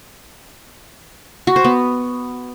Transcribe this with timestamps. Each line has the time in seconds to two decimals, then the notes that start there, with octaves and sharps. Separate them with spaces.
1.47 F#4
1.56 C5
1.64 B3